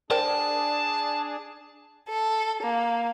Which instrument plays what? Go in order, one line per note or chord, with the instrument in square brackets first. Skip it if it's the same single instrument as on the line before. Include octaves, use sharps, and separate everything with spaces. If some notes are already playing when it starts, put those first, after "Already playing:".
[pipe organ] D4 G#4 [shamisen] A#4 C5 G5 [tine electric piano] D5 [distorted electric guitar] A5
[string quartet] A4
A#3